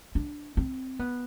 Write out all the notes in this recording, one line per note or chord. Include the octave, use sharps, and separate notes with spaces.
D4
C4
B3